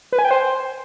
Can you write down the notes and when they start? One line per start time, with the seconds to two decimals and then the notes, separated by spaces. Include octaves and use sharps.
0.12 B4
0.19 G#5
0.25 G5
0.31 C5